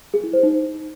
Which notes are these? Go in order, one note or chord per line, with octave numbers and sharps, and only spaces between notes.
G#4
E4
C5
D#4